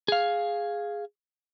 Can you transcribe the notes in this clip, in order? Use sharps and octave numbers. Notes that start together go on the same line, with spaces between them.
G#4 F5